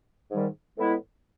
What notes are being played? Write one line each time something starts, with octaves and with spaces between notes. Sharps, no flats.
G#2 D#3 G3
A2 E3 G#3 B3 E4